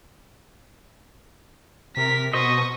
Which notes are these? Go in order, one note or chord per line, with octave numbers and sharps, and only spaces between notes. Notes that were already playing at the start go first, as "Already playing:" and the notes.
C3 A#4 B6
B2 C5 D#5 C#6 D#6